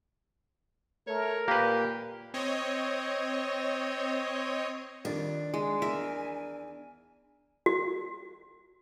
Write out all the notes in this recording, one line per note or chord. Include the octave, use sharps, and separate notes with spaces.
A3 A#4 C#5
A#2 A#3 G4 B4
C4 C#5 D#5
F2 D#3 G3 D4
G#3 G#5
E2 A#4 E5
F#4